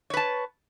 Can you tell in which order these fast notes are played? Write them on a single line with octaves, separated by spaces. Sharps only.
C#5 B4 A5